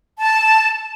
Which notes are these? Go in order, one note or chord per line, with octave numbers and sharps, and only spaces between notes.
A5